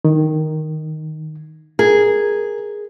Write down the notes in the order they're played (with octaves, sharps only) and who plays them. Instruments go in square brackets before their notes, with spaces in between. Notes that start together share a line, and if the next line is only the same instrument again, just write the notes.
[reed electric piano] D#3
[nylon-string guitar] G#4 [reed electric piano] A#4